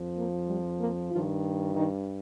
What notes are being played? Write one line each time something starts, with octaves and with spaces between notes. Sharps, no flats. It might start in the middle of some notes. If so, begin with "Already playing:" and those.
Already playing: F2 F3
A#3
G3
A#3
G2 D#3 F3 F4
D#3 D#4